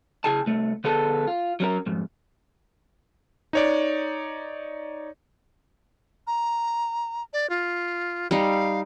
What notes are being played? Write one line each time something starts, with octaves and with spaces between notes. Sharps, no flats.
C#3 E4 G#4 G#5 A5
C2 A3
D3 B3 G#4 A4 A5
F4
F#3 C#4 A#4
F2 G#2
D#4 C#5 D5
A#5
D5
F4
G3 D#4 F5